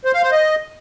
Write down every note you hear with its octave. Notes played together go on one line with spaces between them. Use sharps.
C5
F5
C5
D#5